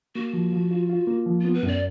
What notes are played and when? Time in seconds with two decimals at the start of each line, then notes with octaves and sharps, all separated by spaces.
0.15 A#3 F#4
0.33 F3
0.52 F3
0.71 F4
0.90 F4
1.07 A#3
1.26 F3
1.41 B3 F4
1.54 B4
1.63 F#2 D5